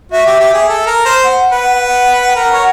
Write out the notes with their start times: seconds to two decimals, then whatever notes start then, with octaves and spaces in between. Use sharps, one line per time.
0.11 F#4 E5
0.26 G4
0.40 G4
0.54 G#4
0.68 A4
0.86 A#4
1.05 C5
1.24 F#5
1.52 B4
1.80 F#5
2.29 G5
2.36 A#4 F#5
2.53 C#5